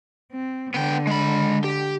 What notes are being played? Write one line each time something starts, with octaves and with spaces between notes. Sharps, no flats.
C4
D3 B3 G5
G#3 B5
G4